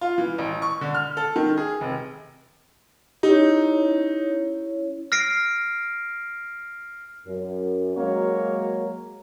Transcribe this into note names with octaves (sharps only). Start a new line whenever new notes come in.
F4
E3
A1
C#6
D3
F6
A4
D#3
G#4
F1
C#4 D#4 E4 G4 C#5
F6 A#6 C7 D7
F#2
F#3 G#3 A#3 F#4 A#4 C#5